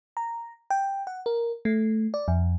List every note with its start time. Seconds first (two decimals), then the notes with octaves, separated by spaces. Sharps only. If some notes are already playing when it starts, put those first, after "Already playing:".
0.17 A#5
0.70 G5
1.07 F#5
1.26 A#4
1.65 A3
2.14 D5
2.28 F2